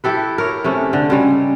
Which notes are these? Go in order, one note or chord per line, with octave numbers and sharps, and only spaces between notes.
E4 G4 A4 B4
A#4 C#5
C3 A3 C#4
D3
C#3 G3 G#3